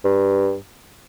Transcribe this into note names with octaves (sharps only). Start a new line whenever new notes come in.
G2